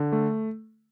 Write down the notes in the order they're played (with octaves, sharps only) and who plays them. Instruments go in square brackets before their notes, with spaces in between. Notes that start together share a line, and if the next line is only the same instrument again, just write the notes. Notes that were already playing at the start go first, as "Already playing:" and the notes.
Already playing: [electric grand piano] D3
A3